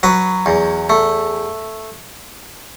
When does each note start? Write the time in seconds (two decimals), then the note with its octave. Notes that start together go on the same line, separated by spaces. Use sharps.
0.03 F#3 B4
0.46 E2
0.90 A3